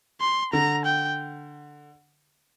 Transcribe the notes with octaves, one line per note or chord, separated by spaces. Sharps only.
C6
D3 A#5
G5